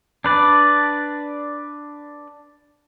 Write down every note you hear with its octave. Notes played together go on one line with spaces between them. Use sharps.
D4 B4 D5